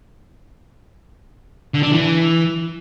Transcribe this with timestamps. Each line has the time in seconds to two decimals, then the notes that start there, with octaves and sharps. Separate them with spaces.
1.74 D3
1.83 D4
1.91 E3